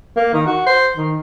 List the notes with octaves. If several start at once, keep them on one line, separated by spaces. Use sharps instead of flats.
A#3
D#3
F#4
C5
D#3